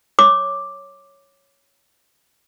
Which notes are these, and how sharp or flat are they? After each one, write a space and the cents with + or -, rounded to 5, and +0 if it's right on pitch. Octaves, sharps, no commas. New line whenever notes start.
C#5 +0 D6 +0